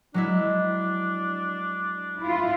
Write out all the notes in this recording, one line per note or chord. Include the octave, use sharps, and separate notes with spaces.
F#3 G#3 D4 E4
E4 F4